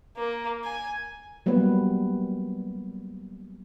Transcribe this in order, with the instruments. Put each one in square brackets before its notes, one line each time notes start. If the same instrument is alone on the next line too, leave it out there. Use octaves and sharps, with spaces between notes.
[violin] A#3
G#5
[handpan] F#3 G3 A#3 B3 B4